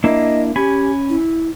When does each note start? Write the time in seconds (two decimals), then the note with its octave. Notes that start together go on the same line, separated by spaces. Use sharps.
0.04 A#3 D4 E4 D#5
0.56 C#4 G4 G#5 B5
1.09 E4